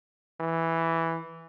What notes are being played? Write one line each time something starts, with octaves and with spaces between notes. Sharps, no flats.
E3